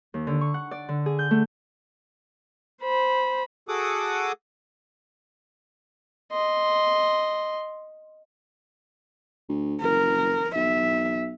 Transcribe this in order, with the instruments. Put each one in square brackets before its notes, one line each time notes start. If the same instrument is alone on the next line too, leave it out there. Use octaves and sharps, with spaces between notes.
[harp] D#2
D3
C#6
F#5
D5
D3
G#4
G6
A3
[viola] C5 B5
[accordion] F#4 G#4 A4 F#5 D6 D#6
[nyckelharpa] D#5 C6
[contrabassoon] D2
[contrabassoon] F#1 [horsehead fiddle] A#4
[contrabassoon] B1 [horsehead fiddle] E5